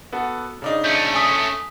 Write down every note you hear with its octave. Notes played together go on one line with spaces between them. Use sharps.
B3 F#4 A4
C#3 D4 D#4
A3 C#4 G6
G#5 D#6 B6